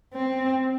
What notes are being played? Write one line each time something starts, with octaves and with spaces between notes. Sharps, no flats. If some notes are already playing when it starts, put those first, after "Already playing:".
C4